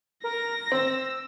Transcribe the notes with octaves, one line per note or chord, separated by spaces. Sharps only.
A#4 A#6
C4 E6